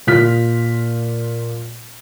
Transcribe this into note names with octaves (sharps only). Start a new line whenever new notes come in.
A#2 F4 F6 B6